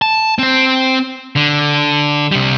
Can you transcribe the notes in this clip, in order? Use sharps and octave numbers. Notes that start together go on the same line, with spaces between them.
A5
C4 C5
D3
C3 G3